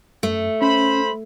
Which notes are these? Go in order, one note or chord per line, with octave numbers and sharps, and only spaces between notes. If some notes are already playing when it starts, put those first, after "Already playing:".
F#2 A3
C#4 C5 B5